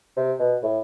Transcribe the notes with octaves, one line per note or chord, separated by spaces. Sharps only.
C3
B2
A2